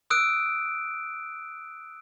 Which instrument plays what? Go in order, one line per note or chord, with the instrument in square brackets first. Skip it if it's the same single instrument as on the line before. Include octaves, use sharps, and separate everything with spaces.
[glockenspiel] D#6 E6 F#6 D7